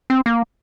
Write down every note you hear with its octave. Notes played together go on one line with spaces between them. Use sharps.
C4
A#3